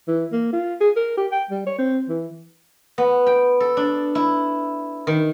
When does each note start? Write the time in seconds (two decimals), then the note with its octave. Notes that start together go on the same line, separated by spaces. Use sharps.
0.08 E3
0.32 A#3
0.53 F4
0.80 G#4
0.96 A#4
1.17 G4
1.32 G5
1.51 G3
1.66 C#5
1.78 C4
2.09 E3
2.98 B3
3.26 G5
3.60 A4
3.77 D4
4.15 E4
5.07 D#3